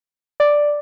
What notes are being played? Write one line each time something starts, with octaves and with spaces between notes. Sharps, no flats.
D5